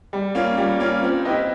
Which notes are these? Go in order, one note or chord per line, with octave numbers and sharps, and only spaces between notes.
G3
A#3 C#4 F4
G3
A#3 C#4 F4
C4
E4 G4 B4 D#5